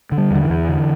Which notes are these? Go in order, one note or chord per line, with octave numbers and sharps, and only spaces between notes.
D3
G3
E2 D3
E3
E2
D3